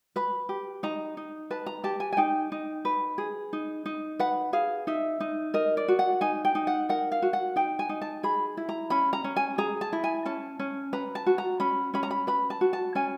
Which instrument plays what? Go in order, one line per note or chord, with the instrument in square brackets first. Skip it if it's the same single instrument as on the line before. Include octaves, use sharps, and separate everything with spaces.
[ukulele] B4 B5
G4
D#4 A#5
D#4
B4 A5
A#5
G4 A5
G#5
G#5
D#4 G5
D#4
B4
G#4
D#4
D#4
B4 F#5
G#4 F5
D#4 E5
D#4
A#4 D#5
D5
F#4
F#5
D#4 G#5
G5
D#4
F#5
A#4 F#5
F5
F#4
F#5
D#4 G5
G#5
D#4
A5
G#4 B5
E4
A#5
C#4 B5
A#5
C#4
G#5
G#4 A#5
A5
E4
G#5
C#4 A5
C#4
B4 A#5
A5
F#4
A#5
C#4 B5
C#4 B5
A#5
B5
B4 B5
A5
F#4
A5
C#4 G#5